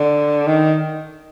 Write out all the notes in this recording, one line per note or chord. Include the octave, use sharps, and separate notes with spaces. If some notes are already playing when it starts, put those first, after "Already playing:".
Already playing: D3
D#3